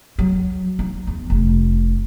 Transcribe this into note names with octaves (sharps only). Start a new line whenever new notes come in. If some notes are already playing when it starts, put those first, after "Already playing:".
F#3
D#4
E2
F1